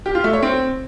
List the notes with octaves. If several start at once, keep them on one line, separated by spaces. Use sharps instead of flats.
G4
F4
A3
C#5
C4